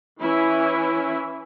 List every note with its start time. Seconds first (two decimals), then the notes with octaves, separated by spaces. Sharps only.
0.21 E3 C#4 E4